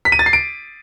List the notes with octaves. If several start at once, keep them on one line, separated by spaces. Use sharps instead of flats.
B6
D#7
A6
C7
D7